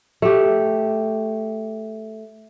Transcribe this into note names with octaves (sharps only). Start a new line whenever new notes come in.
A3 G4